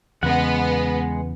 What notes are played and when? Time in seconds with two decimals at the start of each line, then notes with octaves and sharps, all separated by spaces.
0.23 E2 C#3 G#3 B3 F#5